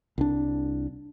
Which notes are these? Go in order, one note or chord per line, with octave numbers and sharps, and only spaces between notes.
C2 D4